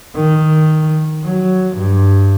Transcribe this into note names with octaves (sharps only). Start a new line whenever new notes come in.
D#3
F#3
G2